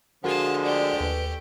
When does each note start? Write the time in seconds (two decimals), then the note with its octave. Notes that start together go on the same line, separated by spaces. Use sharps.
0.24 D3 F3 G#3 F4 F#4 A#4 F#5 A5
0.64 A3 G4 D5
1.00 D#2 B4